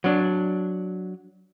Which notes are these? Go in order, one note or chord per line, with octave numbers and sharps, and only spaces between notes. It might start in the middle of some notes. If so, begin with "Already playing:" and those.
F#3 D4